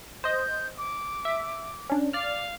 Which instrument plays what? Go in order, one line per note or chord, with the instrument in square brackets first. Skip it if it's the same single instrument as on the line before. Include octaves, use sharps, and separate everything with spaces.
[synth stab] C5 D#5 [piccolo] G6
[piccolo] D6
[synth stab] E5
C#4 D4
[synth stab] D5 F6 [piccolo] F5